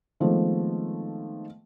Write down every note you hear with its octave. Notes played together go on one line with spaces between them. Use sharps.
D#3 F3 G#3 A3 B3 C4